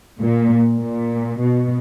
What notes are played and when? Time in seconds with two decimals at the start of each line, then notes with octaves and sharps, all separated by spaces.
0.20 A#2
0.80 A#2
1.41 B2